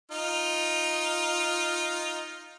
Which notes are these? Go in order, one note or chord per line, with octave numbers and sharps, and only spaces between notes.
D#4 F4